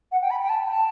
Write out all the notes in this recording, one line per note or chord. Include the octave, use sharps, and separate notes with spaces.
F#5
G5
B5
G5
A5
A5